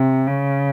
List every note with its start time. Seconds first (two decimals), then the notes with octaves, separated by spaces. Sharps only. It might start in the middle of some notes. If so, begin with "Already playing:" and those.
Already playing: C3
0.27 C#3